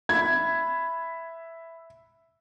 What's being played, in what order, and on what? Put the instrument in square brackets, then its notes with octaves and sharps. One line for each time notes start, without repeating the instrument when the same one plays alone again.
[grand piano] E5 B5 [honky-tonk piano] G#6